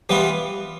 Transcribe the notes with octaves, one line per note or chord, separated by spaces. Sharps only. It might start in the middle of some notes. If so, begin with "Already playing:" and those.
E3 G3 B3 F4